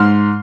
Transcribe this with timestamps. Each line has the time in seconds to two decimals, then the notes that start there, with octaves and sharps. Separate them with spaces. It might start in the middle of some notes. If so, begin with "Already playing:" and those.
Already playing: G#2 C6 F6